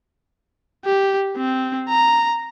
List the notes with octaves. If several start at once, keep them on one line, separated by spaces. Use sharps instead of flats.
G4
C4
A#5